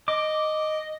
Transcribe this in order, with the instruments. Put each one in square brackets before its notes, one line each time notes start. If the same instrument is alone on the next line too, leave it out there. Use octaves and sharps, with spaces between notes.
[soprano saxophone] D#5 [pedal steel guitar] D6